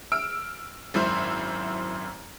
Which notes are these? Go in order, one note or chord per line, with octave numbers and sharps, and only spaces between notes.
E6 F6 D7
G#1 F#2 E4 C5